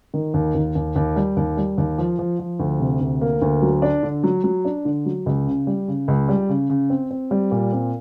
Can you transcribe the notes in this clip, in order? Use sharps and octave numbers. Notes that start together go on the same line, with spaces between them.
D#3
D#2
D#2
D#2
D#2
G3
D#2
G3
D#2
F3
F3
F3
D2
C3
D2
A#3
D2
F#3
D4
D3
F#3
F#3
D4
D3
F#3
C#2
C#3
G3
C#3
C#2
G3
C#3
C#3
C4
C4
G3
A#2
C4